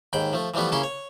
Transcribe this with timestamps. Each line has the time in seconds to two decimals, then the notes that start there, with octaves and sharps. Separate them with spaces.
0.13 D#2 G#2 G5 B5
0.33 F3 A3
0.54 E3 F3 G3 A3 B3
0.72 C#3 A#3 C#4 E4 C6
0.83 C#5